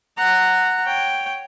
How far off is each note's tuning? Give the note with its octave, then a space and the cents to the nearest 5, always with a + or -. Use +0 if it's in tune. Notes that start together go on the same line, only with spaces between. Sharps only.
F#5 +0 A#5 -15
C#5 +0 G5 +0